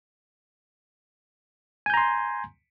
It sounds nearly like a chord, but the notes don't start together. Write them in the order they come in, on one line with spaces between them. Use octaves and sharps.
G#5 G6 A#5 C6